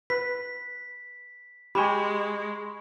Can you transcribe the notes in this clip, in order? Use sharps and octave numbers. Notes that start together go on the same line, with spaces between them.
B4 B6
G#3 G4 G#5 B5 C#6